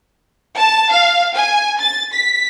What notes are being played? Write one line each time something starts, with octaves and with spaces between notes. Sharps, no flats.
A5
F5
G#5
A6
B6